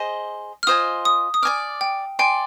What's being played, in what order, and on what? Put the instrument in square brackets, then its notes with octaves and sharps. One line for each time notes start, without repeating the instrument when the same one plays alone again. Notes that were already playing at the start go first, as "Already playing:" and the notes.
Already playing: [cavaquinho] G#4 C5 D#5
[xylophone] F6
[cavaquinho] F4 C5 D#5 G#5 [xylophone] D#6
[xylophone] D#6
D#6
[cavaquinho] D5 G#5 D6 [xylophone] F6
[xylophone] G5
[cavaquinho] D5 G#5 C6 [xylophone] G5